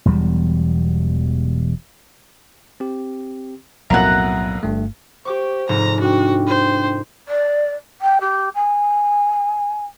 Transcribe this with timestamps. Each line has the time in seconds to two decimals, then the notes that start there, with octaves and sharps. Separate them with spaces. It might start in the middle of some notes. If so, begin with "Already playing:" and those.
0.05 E1 E2 F#3 G3
2.80 C4 G4
3.90 B1 F2 A2 F#3 A#3 E5 F#5 A#5
4.63 G1 G2 A3
5.25 G4 C5 C#6 D6
5.69 F1 G#2 A#5
6.00 D4 F#4 G5
6.47 C5
7.28 D5
8.01 G5
8.21 G4
8.55 G#5